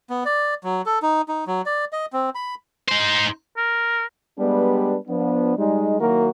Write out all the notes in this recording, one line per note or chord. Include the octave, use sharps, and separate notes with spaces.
B3
D5
F#3
A4
D#4
D#4
F#3
D5
D#5
C4
B5
D#4 C5
A#4
G3 G#3 B3 D4 G4 B4
F3 B3 D4
G3 G#3 D#4
D#3 F#3 A#3 E4 F#4 A#4